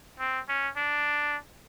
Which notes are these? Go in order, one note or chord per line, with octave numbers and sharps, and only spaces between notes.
C4
C#4
D4